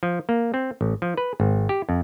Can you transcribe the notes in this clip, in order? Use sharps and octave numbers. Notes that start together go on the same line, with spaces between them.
F3
A#3
C4
A1
F3
B4
G#1
G4
F2